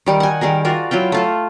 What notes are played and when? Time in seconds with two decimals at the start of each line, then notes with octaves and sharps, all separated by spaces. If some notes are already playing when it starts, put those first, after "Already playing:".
0.06 D#3 G3 D#4
0.20 F#5 G#5
0.41 D#3 G3 G#4 A#4
0.65 F4 F#4 A#4 D5
0.91 F#3 E4 F4 G5
1.12 A3 F4 A4